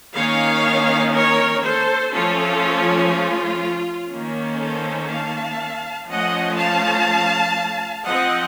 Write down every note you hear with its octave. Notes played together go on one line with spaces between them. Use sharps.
D#3 A#3 C#4 C#5 F5
A#4 C#5
A4 C5
F3 A3 C#4 F4 A4
F4
D#3 A#3 C#4
A4 C5
F5 A5
F3 A3 C#4 D#5 F#5
F5 A5
F3 C4 D#5 F#5